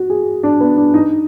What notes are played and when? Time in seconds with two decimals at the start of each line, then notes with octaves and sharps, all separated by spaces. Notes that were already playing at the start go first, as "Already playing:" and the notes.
Already playing: F#4
0.10 G#4
0.43 D4
0.60 B3
0.77 D4
0.94 D#4